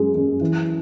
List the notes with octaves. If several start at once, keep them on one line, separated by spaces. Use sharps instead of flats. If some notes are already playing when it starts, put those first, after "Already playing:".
Already playing: F#2 G#3
F#2
E3